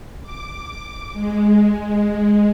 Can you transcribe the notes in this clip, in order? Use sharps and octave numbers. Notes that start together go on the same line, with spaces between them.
D6
G#3